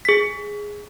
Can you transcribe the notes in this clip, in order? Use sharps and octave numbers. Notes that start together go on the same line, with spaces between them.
G#4 B6